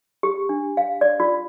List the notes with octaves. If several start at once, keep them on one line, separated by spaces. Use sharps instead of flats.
G4
D4
F5
D5
F4